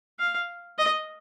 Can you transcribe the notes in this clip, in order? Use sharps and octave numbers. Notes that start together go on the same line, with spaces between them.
F5
D#5